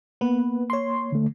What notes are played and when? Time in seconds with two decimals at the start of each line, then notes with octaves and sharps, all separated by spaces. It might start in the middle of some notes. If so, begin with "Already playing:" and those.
0.21 A#3 B3 B4
0.70 C#5 C6
1.12 D3 A3